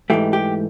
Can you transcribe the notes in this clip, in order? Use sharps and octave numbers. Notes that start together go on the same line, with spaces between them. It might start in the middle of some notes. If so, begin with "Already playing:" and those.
G#2 E3 A3 G4
G4